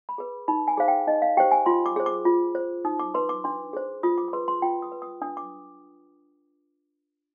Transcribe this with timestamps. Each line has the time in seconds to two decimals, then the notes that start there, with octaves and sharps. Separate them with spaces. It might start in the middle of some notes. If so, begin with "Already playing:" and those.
0.09 B5
0.18 G#4 B4
0.48 D#4 B5
0.68 G#5
0.78 G#4 C5 F5
0.88 G5
1.07 D#4 D#5
1.22 F5
1.37 G4 C5 G5
1.51 G#5
1.66 F4 C6
1.86 D6
1.96 G#4 C5
2.06 D6
2.25 F4
2.55 C5
2.85 D#4 D#6
2.99 D6
3.14 B4 C6
3.29 D6
3.44 D4 C6
3.73 G#4 C5
4.03 F4 D#6
4.18 D6
4.28 D6
4.33 G#4 B4 C6
4.48 C6
4.62 F4 G5
4.82 D#6
4.92 B4
5.02 D#6
5.22 D4 D#6
5.37 D6